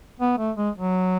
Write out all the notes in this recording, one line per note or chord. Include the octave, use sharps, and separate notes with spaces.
B3
A3
G#3
F#3